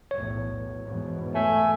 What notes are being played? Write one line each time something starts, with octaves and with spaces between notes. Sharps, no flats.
B1 E2 A2 C#5
E2 G#2 B2
A3 E5 G#5